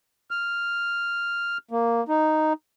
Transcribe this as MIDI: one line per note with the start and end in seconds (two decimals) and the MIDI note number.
0.31 1.58 89
1.71 2.04 58
2.09 2.53 63